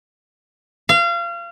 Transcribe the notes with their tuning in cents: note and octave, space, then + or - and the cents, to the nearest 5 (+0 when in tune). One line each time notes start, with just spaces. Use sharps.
F5 -30